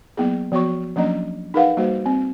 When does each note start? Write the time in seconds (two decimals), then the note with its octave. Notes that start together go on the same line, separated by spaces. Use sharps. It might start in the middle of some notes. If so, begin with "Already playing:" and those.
0.17 F#3 A#3 B3 E4 G#4
0.52 F3 B3 F#4 C#5 C#6
0.96 F3 F#3 A#3 C#4 D4 D#5
1.54 D#4 G#4 A#4 B4 F5 F#5
1.77 G3 A#3 F#4 C5
2.06 C4